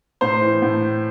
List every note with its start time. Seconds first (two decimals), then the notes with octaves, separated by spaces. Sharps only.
0.21 A2 C5
0.42 E3
0.62 A2